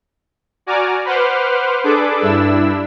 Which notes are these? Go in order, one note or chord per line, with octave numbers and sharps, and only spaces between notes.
F#4 D5 G#5 A#5 D6 F6
B4 C5 F#5 C6 D6 F6
D4 G#4 A4 B4 D6
G2 D4 E4 E6